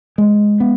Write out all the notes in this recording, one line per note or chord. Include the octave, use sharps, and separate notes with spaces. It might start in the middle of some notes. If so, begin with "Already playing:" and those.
G#3
B3